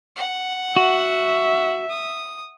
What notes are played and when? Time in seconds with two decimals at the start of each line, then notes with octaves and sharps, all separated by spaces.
0.16 F#5
0.76 F#4 E5
1.89 D#6